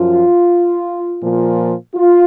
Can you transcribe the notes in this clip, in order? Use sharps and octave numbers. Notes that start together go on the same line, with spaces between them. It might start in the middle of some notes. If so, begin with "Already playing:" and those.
Already playing: F#2 F3 F4
A#2 F3
F4